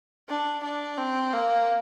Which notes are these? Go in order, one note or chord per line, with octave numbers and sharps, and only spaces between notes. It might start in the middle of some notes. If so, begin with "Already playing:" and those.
D4
D4
C4
A#3